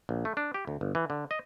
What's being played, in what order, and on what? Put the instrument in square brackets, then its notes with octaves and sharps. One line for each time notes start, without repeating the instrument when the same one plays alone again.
[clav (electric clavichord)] A#1
A3
D4
G4
D2
G1
E3
D3
D#5